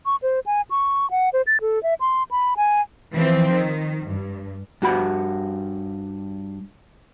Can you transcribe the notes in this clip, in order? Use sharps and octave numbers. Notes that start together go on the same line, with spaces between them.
C#6
C5
G#5
C#6
F#5
C5
A6
A4
E5
C6
B5
G#5
E3 F3 C4
D#3
G2
G2 F#4 B5